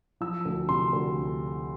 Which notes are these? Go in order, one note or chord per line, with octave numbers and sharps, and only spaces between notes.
F3 E6
D2
C3 C6
D2